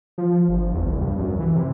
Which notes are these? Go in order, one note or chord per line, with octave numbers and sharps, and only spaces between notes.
F3
G1
E2
C2
G2
F#2
E3
C3